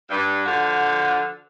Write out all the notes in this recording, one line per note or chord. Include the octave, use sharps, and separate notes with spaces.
G2
D3 F3 F#4